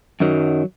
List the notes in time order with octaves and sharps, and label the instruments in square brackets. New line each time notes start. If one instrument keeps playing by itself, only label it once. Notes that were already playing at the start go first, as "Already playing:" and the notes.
[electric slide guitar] F#2 D#3 F#3